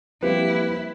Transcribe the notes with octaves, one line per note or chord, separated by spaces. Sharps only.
F3 G3 A#3 C4 E4 G4 B4